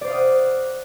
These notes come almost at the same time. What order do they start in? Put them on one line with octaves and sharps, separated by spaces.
D5 C5 F5 D#6 F#5